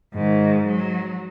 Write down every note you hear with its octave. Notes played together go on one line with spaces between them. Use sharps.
G#2 D#3
F#3